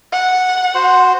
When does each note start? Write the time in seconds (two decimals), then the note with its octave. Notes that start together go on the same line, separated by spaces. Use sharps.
0.12 F#5
0.75 F#4 C5